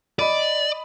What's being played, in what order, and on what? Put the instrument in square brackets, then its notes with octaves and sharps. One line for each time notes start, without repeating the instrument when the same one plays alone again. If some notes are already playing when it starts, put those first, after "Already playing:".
[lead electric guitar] D5 [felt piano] D#5 B5 D#7